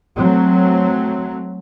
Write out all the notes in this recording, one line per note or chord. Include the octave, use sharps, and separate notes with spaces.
F#3 A3 C4